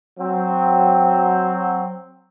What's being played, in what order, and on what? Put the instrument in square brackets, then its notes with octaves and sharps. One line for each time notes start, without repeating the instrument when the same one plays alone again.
[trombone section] F#3 C4